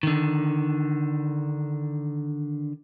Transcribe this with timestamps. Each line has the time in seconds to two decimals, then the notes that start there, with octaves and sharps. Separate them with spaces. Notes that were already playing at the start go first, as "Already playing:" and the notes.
0.03 D3 D#3